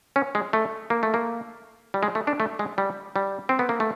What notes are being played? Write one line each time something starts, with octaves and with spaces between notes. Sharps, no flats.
C#4
G#3
A3
A#3
A3
A#3
G3
G#3
A3
D4
A3
G#3
G3
G3
C4
B3
A#3
A3